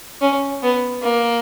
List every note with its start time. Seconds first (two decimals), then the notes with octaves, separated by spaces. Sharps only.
0.21 C#4
0.63 B3
1.03 A#3